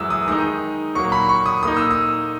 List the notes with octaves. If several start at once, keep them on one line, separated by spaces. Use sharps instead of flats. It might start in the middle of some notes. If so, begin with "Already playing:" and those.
Already playing: F#2 E3 G#3 D#6 E6
D#6
D#3 G#3 D#4 D#6
A#2 F#3 A#3 C#6
B5
C#6
D#6
A#2 A#3 D#4 D#6
E6
D#6